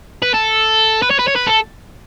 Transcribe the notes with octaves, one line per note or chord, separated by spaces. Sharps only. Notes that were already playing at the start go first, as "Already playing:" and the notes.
B4
A4
B4
C#5
B4
C#5
B4
A4